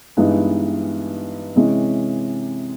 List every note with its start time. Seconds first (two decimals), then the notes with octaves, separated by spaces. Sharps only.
0.17 G2 E3 G#3 B3 D#4
1.56 C3 E3 G#3 C#4